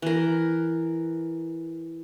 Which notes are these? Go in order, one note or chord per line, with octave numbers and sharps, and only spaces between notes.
E3 A#4